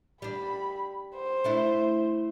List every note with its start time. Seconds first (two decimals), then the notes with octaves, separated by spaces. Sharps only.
0.22 G3 D4 B5
1.15 C5
1.44 A3 D4 E4